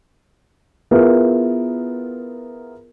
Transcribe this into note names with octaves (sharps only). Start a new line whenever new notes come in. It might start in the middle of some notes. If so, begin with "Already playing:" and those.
B3 E4 F4 G#4 A#4 B4